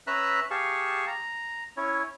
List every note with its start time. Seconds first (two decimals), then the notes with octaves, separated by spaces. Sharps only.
0.07 C#4 B4 E5 A#5 E6 F#6
0.51 G4 G#4 F5 A5 C#6
1.07 A#5
1.77 C#4 E4 C#5